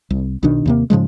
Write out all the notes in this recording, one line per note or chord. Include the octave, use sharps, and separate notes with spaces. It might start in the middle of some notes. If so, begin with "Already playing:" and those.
C2
B1 B2 D#3 D4
D#2 C3 A#3
G#2 C#3 F3 G#3